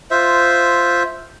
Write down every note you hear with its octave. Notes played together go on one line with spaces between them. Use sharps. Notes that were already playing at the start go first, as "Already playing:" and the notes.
F4 C5 E5